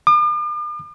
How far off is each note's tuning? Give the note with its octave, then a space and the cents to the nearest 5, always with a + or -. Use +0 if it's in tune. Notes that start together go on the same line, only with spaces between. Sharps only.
D6 +45